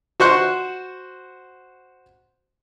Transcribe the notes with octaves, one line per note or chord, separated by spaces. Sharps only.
F#4 C5 C#6 F#6